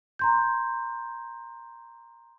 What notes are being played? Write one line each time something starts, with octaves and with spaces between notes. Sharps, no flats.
A#5 C6 G6